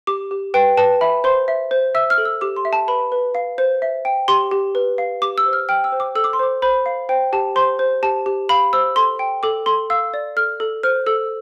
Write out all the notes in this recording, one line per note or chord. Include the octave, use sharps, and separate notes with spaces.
G4 D6
G4
B4 G5
B4 A5
E5 B5
C5 C6
E5
C5
E5 E6
F6
A4
E6
G4 D6
C6
E5
A5
B4 B5
B4
F5
C5
E5
G5
G4 C6
G4
B4
F5
G4 D6
E6
C5
F6
G5 F6
E6
C5
D6
A4 E6
D6
C6
C5 D6
C5 B5
F5
C5 G5
G4 A5
C5 C6
C5
G4 A5
G4
F5 B5
C5 E6
A4 C6
G5
A4 D6
A4 C6
F5 E6
D5
A4 F6
A4
C5 F6
A4 E6